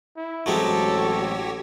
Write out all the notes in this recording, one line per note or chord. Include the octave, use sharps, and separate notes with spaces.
E4
A1 F#3 G#3 C4 F#4 G4 A4 C#5